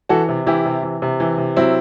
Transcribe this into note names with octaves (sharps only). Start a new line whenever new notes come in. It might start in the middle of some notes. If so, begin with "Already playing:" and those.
E3 F#4 A4
C3
E3 E4 G4
C3
E3
C3
E3
C3
F#3 C4 E4